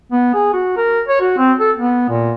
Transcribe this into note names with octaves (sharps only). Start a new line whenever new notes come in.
B3
G#4
F#4
A#4
C#5
F#4
C4
A4
B3
A#2